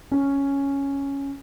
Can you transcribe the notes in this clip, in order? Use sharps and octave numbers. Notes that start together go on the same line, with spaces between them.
C#4